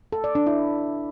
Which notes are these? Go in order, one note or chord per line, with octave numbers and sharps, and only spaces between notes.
A4
D5
D4
E4